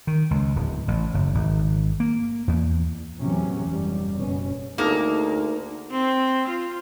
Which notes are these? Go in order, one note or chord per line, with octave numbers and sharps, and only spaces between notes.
D#3
C#2
D1
A1
F#1
G#1
A#3
E2
E2 A2 C3 E3 F#3 C#4
F1 G#2 G3
F#1 B2 C#4
D2 A#3 D#4 G#4 A4
C4
F4